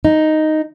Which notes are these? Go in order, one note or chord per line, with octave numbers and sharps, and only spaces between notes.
D#4